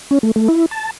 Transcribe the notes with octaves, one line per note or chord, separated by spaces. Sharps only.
C#4
A3
A3
E4
A5